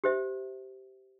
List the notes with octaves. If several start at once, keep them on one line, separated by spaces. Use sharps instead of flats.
G4 C5 E5